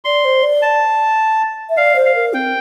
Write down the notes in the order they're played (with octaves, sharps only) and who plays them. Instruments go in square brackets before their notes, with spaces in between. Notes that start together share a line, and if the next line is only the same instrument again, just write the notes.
[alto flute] D5 [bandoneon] C6
[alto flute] C5
D5
[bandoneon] A5
[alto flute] E5
[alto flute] D5 [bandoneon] F5
[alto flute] C5
[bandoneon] F5
[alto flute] A#4
[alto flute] C4 [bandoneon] G5